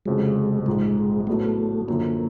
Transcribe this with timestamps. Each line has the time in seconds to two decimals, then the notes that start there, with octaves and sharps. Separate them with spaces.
0.06 F1 F2 C#3 F#3 G#3
0.66 A#1 G#2 F3 G#3
1.27 A2 F#3 A3 B3
1.88 F#2 D3 F3 A#3